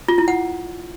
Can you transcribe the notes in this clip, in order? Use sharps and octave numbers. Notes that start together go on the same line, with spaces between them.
F4
E4
F#5